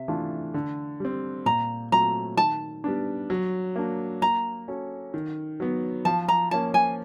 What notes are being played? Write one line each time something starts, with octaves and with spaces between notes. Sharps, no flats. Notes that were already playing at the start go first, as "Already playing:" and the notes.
Already playing: C3 E5
E3 A3 D4 F4
D3
G3 C4
A#2 A#5
F#3 A3 C4 F4 A#5
D#3 A5
G3 B3 D4
F#3
A#3 D4
A#3 A#5
C#4 F#4 A4
D#3
F#3 B3
F3 A5
A#5
A#3 C#4 A5
G#5